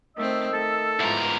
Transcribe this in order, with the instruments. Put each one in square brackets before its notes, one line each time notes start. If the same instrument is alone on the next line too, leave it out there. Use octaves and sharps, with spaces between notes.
[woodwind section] D#3 D#5 E6 [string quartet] A3 C4
[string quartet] A3 [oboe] A4
[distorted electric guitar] E2 A#4 [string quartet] G#2 E3 F3